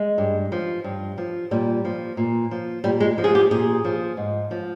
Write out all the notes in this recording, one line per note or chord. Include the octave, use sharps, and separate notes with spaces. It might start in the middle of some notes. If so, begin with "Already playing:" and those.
Already playing: G#3
G2
F3
G2
F3
A#2 G3
F3
A#2
F3
A#2 G3
G#3
F3
G#4
G4
A#2 G#4
F3
G#2
F3